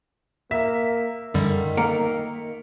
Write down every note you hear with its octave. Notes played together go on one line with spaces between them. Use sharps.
A#3 E5
F#2 D3 D#3 G3
A#3 C#7